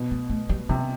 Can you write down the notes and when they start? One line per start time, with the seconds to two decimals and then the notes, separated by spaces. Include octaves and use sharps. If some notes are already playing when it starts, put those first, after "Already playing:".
Already playing: B2
0.11 B3
0.29 A3
0.49 G3
0.69 C3 G3